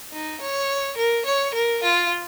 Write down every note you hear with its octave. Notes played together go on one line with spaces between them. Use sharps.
D#4
C#5
A#4
C#5
A#4
F4